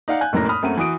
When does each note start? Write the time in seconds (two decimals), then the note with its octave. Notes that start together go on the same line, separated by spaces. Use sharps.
0.08 D#4 D5 F5 F#5
0.21 G#5 F#6 G6
0.33 F1 F#2 A2 A#3 A#4 A#6
0.49 B5 D#6 F6
0.63 F#2 A3 A#3 C4 F#5 D#7
0.77 E3 F#4 D#6 D7